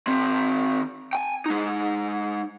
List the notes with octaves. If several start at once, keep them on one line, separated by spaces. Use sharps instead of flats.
D#3 C4
G5 G#5
G#3 D#4